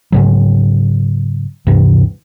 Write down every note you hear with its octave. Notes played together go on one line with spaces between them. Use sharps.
G#2 C#3 F#3
D2 G2 C3 E3